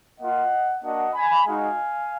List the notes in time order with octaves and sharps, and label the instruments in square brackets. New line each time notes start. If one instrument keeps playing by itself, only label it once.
[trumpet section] A#3 F4 D#5 F#5
A#3 D4 F#4 D#5 F#5
G#5 B5
G#3 D#4 F#4 F5 G#5